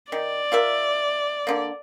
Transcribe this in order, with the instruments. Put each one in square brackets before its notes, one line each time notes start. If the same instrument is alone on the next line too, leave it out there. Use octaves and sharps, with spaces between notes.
[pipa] D#3 [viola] D5
[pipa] F4 A#4 E5
D3 A#3